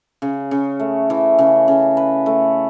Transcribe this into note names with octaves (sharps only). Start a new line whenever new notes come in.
C#3
C#3
A3
E3
C#3
C#3
B4
A3